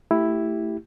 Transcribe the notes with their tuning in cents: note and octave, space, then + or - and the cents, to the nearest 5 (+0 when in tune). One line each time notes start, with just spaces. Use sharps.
A3 +15 E4 +0 G4 +0